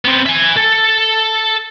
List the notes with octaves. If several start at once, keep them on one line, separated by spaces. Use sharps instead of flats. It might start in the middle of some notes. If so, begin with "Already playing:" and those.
B3 C4
E5 G#5
A4